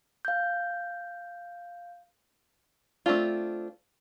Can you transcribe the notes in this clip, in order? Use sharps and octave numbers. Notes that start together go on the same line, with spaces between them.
F5 G6
A3 C4 D4 F4